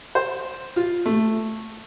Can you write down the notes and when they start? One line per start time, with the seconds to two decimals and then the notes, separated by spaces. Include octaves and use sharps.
0.15 C5
0.76 F4
1.06 A3